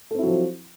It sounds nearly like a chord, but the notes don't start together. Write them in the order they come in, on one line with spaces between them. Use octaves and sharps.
A4 C4 E4 F#3 F3